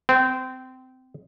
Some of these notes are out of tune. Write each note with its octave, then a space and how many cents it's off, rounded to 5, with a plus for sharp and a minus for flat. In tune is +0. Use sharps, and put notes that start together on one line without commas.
C4 -20